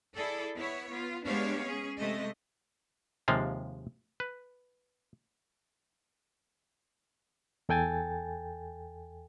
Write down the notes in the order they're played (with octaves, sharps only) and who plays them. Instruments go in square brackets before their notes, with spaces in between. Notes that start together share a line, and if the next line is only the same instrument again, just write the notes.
[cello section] E4 G#4 A4 D5
B3 E4 C#5
B3 F4
G#3 B3 D4 G4 C#5 F5
C#4 G#4
C3 G#3 A3 D#5
[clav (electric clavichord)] D#2 C3 F3 G#3 F5
B4
[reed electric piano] E2 A4 G5 G#5 A6